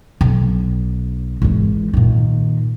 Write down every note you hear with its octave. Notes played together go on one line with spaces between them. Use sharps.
B1
G#1 E3
A#2 D#3